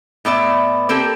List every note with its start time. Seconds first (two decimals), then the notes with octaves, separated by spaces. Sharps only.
0.25 A2 B3 D5 E5
0.89 A#3 C4 G4 A4